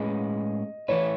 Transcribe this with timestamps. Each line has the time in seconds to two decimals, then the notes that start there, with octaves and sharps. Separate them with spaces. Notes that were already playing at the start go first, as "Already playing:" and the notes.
Already playing: A2 G#3 C#4 G#4 B4 D#5
0.88 E3 A3 E4 B4 C#5